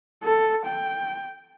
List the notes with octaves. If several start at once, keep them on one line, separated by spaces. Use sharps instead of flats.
A4
G5